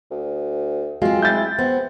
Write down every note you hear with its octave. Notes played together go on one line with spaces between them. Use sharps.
D2
F#3 G#3 C4 F4
E4 G6 A6
B3 C4